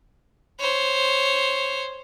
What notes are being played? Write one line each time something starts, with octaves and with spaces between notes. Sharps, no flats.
C5 C#5